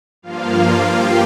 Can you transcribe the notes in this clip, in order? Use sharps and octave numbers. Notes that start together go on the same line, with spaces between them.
G2 F3 A#3 F4 F5
G4 G5